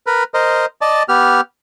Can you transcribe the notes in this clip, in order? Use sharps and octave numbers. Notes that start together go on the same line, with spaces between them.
A#4 B4
A#4 C5 D#5
D5 D#5 A5
B3 G4 F6